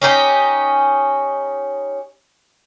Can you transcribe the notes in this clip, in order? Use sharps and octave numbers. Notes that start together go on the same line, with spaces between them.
C#4 D#4 G4